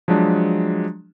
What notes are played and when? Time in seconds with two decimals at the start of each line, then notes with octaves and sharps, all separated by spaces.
0.08 F3 F#3 G#3 D4